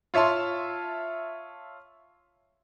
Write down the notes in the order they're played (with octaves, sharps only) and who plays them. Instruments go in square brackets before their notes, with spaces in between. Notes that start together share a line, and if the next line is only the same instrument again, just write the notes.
[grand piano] F4 C#5 E5 A5 C6